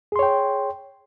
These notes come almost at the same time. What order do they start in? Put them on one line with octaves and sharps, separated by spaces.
G#4 C6 C#5 G5